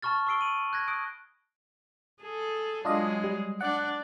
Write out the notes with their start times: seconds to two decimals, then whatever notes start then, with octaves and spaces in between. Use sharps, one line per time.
0.02 A5 B5 C#6 F6 A6
0.27 C#6 E6 C7 D7 G7
0.41 D#7 F#7
0.73 F#6 G#6 A#6
0.88 D#6 F#6 D7
2.22 G#4 A4
2.85 F#3 G#3 D4 F4 G#4 D#5
3.24 G3
3.61 D4 D5 F#5 F#6